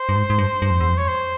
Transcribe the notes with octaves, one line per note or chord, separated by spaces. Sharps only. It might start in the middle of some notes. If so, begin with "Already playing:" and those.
Already playing: C5
G2
G#2
G#2
G2
G2
F2
E2
F2
C#5
C5